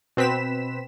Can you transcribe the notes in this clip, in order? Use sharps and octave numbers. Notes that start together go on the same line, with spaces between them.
B2 C4 B4 B6 E7